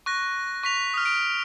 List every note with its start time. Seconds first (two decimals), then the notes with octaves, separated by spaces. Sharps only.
0.06 C#6 F#6 A#6
0.63 C#6 B6 F7
0.94 D#6 F6
1.05 D7